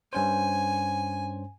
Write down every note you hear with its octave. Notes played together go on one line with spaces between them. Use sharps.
G2 C#4 C5 G#5